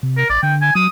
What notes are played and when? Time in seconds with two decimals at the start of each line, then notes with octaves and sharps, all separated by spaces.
0.03 C3
0.17 A#4
0.30 A1 D5
0.43 D3 G5
0.62 G#5
0.75 F#3 D#6